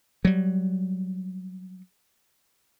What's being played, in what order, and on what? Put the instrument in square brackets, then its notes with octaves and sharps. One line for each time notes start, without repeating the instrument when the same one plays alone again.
[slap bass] F#3 G3